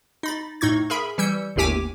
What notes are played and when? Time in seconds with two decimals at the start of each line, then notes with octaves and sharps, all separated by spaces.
0.23 D#4 B5 A6
0.61 A2 D#4 C#6 G#6
0.90 G#4 A#4 E5 B5
1.18 E3 G3 E6 G6 C#7
1.56 G1 D#2 A2 G4 G#5 D6